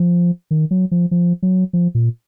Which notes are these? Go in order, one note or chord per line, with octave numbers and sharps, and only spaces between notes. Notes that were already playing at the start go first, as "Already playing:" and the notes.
Already playing: F3
D#3
F#3
F3
F3
F#3
F3
A#2